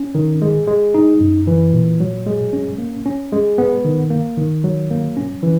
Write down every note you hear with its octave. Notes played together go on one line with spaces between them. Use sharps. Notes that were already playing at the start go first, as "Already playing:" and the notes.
Already playing: C#4
D#3
G#3
G#3
D#4
F#2
E3
A#2
F#3
G#3
C#4
A#3
C#4
G#3
B3
D#3
A#3
D#3
F#3
A#3
C#4
E3